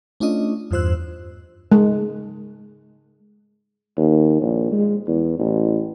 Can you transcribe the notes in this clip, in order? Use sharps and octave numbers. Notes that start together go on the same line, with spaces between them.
A3 C#4 D4 F4 D#5
E2 G2 F4 C5 E6 F#6
G#3
D#2
A#1
G#3
E2
A1